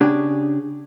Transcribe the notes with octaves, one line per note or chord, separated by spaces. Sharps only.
C#3 D4 G4 G#4